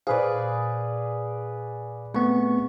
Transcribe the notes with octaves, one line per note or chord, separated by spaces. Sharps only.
A#2 G#4 B4 C5 D5 F5
A3 B3 C4 C#6